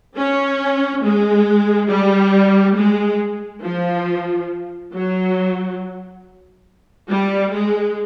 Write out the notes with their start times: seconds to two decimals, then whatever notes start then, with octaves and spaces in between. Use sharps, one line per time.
0.15 C#4
1.03 G#3
1.89 G3
2.76 G#3
3.63 F3
4.94 F#3
7.10 G3
7.53 G#3